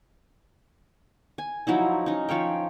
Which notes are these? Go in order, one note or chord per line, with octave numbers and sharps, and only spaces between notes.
G#5
F3 F#3 D#4 E4
C#4 D#4
F3 C#5 F5 G5